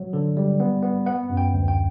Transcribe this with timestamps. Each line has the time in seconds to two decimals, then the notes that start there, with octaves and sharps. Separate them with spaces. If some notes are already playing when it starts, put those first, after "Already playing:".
Already playing: F#3
0.13 D3
0.37 G3
0.60 B3
0.83 B3
1.06 B3 F#5
1.30 F#2
1.37 G5
1.53 D2
1.68 G5